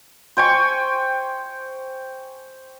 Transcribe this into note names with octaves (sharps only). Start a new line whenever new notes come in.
C5 G5 G#5 C#6